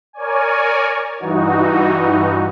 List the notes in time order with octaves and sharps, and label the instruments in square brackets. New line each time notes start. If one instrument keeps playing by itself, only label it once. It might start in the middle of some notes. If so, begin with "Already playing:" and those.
[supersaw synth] A#4 C#5 D5 G#5
G2 E3 D#4 F#4